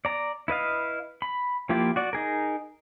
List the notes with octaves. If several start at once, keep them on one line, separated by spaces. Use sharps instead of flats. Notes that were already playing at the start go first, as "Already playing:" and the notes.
D5 A#5
E4 B4 D#5 F5
B5
F3 A#3 E4 F4 G4
F#4 D5
D#4 G#4 A#4